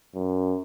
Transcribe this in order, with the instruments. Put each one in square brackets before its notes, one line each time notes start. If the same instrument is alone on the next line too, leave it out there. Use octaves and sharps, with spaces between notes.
[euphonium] F#2